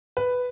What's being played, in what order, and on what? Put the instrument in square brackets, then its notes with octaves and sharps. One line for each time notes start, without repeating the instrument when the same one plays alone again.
[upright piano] B4